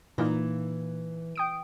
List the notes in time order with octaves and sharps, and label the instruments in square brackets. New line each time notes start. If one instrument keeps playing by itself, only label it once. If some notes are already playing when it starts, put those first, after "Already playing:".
[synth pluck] A#2 A#3 D#4 [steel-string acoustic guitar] E3
[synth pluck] G5 D#6 D7